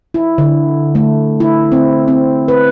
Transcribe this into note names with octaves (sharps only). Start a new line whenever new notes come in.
E4
D3
A3
E4
C4
C4
B4